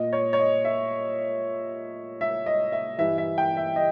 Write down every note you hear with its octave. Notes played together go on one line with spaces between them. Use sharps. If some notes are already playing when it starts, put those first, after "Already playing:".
Already playing: A#2 D#5
C#5
C#5
D#5
E5
E5
D#5
E5
G2 E3 E5
E5
G5
E5
D#5